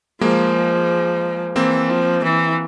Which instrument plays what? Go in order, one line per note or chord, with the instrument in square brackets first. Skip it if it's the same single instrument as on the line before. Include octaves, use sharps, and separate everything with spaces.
[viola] F3 [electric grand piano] G#3 A#3
[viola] E3 [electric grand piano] A#3 C4
[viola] F3
E3